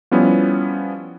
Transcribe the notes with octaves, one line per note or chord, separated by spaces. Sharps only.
F3 G3 B3 C#4 E4